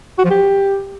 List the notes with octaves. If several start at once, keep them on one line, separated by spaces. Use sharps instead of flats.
F#4
F3
G4